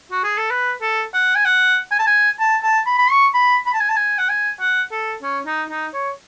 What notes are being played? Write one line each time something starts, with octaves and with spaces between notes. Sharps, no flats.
F#4
G#4
A4
B4
A4
F#5
G#5
F#5
G#5
A5
G#5
A5
A5
B5
B5
C#6
B5
B5
A5
G#5
A5
G#5
F#5
G#5
F#5
A4
C#4
D#4
D#4
C#5